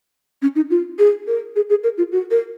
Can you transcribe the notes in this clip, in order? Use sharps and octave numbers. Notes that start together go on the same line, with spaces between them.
C#4
D#4
F4
G#4
A#4
G#4
G#4
A#4
F4
F#4
A#4